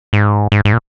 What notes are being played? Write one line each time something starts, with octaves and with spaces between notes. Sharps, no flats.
G#2
G#2
G#2
A#2